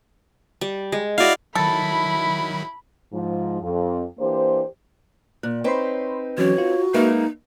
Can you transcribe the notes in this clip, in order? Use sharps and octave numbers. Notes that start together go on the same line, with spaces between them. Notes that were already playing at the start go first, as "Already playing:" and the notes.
G3
G#3
E4 F#4 D5 D#5 F5
D#3 F#3 E4 A4 B5
G#2 F3
F2
E3 A#3 D4 G4 C5
A#2 F#6
C4 D#4 B4 C#5 B5 C6
E3 F#3 C#4 F#4 C#5
F4
G#3 A#3 D#4 B4 E5